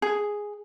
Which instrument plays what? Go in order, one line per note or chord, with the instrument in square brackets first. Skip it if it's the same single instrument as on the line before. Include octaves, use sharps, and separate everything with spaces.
[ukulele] G#4